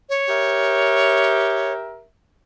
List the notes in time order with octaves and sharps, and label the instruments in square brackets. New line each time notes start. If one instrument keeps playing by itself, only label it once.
[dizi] C#5
[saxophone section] G4 A#4 E5